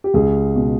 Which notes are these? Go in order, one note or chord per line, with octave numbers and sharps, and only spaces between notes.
G4
C#2 G#4
B2